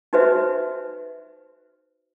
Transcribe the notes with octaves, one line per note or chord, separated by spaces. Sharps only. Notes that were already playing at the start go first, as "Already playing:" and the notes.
D#4 F#4 B4 C5 E5